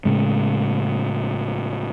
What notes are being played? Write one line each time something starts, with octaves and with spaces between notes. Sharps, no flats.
A2 C#3 G#3